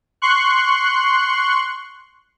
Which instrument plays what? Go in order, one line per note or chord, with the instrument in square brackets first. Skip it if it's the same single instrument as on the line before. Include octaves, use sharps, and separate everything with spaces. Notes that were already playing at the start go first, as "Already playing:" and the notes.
[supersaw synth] C6 C#6 F#6